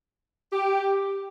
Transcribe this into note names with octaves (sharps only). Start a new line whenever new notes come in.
G4